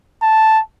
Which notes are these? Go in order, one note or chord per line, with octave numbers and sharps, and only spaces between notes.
A5